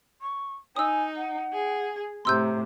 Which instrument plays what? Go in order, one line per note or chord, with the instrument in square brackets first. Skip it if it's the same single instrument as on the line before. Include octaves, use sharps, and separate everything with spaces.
[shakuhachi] C#6
[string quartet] D#4 [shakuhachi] G#5 [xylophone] D#6 E6
[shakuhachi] F#5
[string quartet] G#4
[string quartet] A2 C3 [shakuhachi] A#5 [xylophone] C6 E6 G6